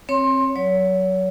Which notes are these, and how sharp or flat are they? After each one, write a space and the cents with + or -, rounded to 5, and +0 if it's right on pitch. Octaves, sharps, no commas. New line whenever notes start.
C4 +30 C#5 +0 C6 +20
F#3 +0 C#5 +30